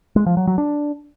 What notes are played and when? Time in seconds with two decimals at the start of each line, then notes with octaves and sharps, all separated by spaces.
0.16 G#3
0.26 F3
0.37 F#3
0.47 F#3
0.58 D4